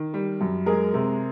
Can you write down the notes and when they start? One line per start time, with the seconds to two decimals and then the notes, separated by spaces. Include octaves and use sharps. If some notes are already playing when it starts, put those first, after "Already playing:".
Already playing: D#3
0.14 G3
0.41 F#2
0.66 G#3 G#4 A#4
0.94 C3